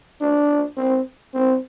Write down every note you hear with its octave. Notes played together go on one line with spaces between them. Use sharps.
D4
C4
C4